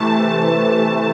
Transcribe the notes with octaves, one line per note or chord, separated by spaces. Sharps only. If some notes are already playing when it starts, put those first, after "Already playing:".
Already playing: C3 E3 A3 A5